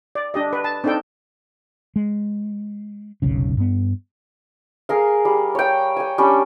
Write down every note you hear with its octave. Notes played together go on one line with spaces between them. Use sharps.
D5
D4 G4 D#5
B4
A5
C4 D4 D#4 A4 G5
G#3
F1 B1 C#3
G2 B3
G#4 A#4 F5
G3
C#5 G5
G5 G#5
G3 C#4 D4